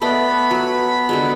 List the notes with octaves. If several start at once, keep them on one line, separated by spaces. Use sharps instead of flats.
A3 B3 D5 D#5 B5
F#3 G#5
D3 F#3 G#3